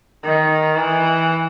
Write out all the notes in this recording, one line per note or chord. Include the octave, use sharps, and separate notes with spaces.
D#3
E3